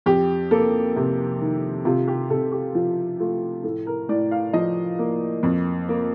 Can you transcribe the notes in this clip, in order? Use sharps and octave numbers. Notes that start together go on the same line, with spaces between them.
F2 G4
A#3 A4
C3
D#3
C3 F4
G4
C3 A4
G4
F3 F4
A3 F4
A2 A4
A#4
A2 D5
F5
F3 D#5
A#3
F2
A#3